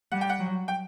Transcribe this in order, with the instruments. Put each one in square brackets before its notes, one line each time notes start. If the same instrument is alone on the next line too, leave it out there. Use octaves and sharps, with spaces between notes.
[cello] G3 [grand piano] F#5
[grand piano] G5
F#5
[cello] F#3
[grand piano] G5